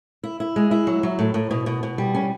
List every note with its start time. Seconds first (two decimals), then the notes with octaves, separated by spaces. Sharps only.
0.23 E4
0.40 E4
0.56 G#3
0.71 E4
0.87 F#3
1.03 F#3
1.19 A2
1.34 A2
1.51 B2
1.66 B2
1.83 B2
1.98 G3
2.15 C#4